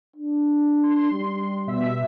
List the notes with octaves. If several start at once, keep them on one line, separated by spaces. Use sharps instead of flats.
D4
C6
G3
B2 E5 B6